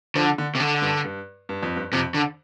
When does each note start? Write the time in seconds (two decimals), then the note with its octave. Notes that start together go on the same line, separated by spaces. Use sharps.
0.15 D3 F3
0.38 D3
0.55 C3
0.60 D3
0.82 G2
1.04 G2
1.49 G2
1.63 F2
1.76 G2
1.93 F2 C3
2.14 D3